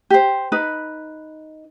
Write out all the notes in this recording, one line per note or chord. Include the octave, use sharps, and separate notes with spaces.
G4 C5
D#4 B4 B5